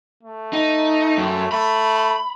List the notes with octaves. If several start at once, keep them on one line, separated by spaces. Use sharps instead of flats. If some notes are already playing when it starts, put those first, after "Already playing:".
A3
D#4
F#2
A3 B5